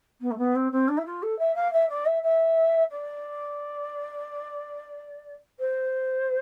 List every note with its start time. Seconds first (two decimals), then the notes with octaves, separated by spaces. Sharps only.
0.21 B3
0.31 A3
0.38 B3
0.55 C4
0.71 C4
0.88 D4
0.97 E4
1.05 F4
1.22 A4
1.38 E5
1.55 F5
1.72 E5
1.89 D5
2.06 E5
2.23 E5
2.90 D5
5.59 C5